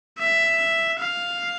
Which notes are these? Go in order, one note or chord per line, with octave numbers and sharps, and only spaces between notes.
E5
F5